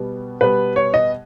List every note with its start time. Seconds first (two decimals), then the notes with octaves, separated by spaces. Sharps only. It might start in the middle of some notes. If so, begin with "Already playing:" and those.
Already playing: B2 G3 B3
0.41 B2 G3 B3 B4
0.76 C#5
0.94 D#5